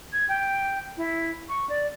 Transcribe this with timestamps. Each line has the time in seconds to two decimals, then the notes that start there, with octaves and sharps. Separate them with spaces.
0.13 G#6
0.29 G5
0.97 E4
1.49 C#6
1.69 D5